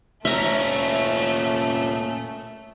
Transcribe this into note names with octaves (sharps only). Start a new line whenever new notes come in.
A#2 A3 C#4 E5 A#5